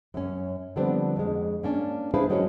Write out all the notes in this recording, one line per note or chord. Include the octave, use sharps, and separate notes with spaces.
F#2 C#4
D3 F3 G3 B3 C4 D4
F2 G#3
A#3 C#4 D4
D4 E4 G#4 B4 C5 F5
F#3 G#3 C#4 F#4 A#4 C#5